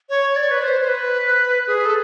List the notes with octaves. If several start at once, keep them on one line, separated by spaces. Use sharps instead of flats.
C#5
D5
B4
C5
C5
B4
G#4
A4